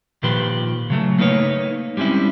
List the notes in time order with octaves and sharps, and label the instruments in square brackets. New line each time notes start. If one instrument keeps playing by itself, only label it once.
[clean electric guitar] A#2 D#3 F3 G4 B4 C6
C#3 F#3 A3
A3 A#3 D#4 B4 C#5
G3 G#3 C4 C#4 E4